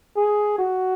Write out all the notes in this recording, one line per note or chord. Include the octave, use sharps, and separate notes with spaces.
G#4
F#4